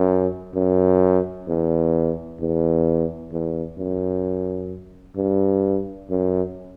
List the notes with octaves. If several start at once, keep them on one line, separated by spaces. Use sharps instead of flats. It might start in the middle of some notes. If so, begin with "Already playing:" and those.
Already playing: F#2
F#2
E2
E2
E2
F#2
G2
F#2